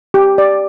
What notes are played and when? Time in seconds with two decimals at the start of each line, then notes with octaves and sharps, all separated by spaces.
0.14 G4
0.38 D5